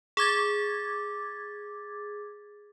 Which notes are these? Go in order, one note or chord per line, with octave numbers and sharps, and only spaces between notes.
G#4 D6 G#6 A6